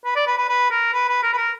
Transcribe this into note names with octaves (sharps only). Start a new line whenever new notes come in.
B4
D5
B4
B4
B4
A#4
B4
B4
A#4
B4
A#4